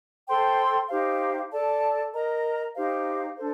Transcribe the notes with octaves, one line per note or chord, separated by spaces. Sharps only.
A4 C5 G5 C6
D#4 G4 C5 F5
A4 D5 A5
A#4 D#5 A#5
D#4 G4 C5 F5
D4 A4 C5